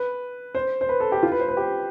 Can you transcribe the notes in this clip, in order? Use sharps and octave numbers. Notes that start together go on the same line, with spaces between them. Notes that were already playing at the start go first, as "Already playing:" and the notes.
Already playing: B4
C5
C5
B4
A4
G4
F4
B4
C5
B4
G4